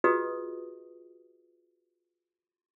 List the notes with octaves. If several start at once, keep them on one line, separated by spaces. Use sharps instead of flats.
F4 F#4 G#4 B4 D#5 D#6